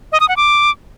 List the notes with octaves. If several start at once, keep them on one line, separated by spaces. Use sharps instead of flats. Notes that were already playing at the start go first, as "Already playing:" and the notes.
D#5
D#6
F#5
D6